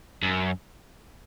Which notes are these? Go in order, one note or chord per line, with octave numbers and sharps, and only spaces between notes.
F#2